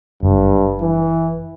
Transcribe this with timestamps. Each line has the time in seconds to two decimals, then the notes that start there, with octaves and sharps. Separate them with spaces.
0.23 F#1 G2
0.81 E3